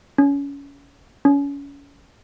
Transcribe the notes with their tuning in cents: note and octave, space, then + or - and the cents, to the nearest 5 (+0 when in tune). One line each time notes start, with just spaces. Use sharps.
C#4 +25
C#4 +30